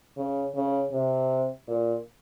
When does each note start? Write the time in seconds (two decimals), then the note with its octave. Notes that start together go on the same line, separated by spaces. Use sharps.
0.18 C#3
0.56 C#3
0.92 C3
1.68 A#2